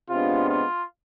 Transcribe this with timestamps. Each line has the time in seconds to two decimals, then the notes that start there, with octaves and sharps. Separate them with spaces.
0.10 C3 G#3 B3 D4 F4
0.49 F4